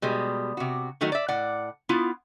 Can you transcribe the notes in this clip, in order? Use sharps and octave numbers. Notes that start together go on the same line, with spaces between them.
B2 G3 G#3
C3 F#4
D#3 F#3 A3 D#4 F#4
D5 E5
A2 D5 F#5
B3 E4 F4